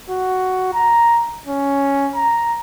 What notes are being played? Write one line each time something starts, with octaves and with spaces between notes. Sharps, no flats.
F#4
A#5
C#4
A#5